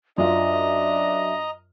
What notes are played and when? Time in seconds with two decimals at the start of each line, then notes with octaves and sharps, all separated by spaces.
0.18 F#2 D4 F4 D#5 E5 A#5